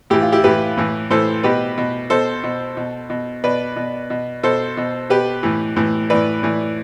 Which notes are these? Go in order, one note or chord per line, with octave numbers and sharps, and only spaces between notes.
A2 E3 E4 G4
F4
E4 G4
A2 E3 G4 B4
A2 E3
A2 E3 A4 C5
B2 G4 B4
B2
B2 A4 C5
B2
B2
B2
B2 B4 D5
B2
B2
B2 A4 C5
B2
B2 G4 B4
A2 E3
A2 E3
A2 E3 B4 D5
A2 E3